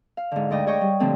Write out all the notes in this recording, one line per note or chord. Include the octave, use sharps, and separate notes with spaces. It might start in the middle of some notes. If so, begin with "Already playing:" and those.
F5
G#2 D3
D2 G#3 D5 D#5 G5
G#4 C#5 D#5 G5 C#6
G3
A#2 D3 F3 A3 C4